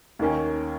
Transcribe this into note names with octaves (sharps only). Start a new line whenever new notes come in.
D#2 D#3 A#3 C#4